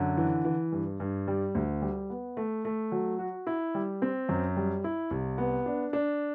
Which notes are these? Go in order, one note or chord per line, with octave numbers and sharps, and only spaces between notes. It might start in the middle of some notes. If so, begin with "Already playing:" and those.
Already playing: F#2 D3
E3
E3
G2
G2
G3
D2
G3
B3
A3
A3
F#3
F#4
E4
G3
C4
F#2
G3
E4
C2
B3
D4
D4